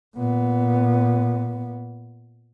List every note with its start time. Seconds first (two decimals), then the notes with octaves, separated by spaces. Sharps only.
0.16 A#2 B3